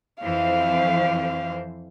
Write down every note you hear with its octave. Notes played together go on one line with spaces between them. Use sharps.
F2 E3 C5 F5